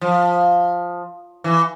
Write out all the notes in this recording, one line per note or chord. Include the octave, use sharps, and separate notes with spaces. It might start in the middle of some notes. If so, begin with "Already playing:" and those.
F3
E3